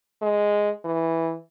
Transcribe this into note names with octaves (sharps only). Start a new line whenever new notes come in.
G#3
E3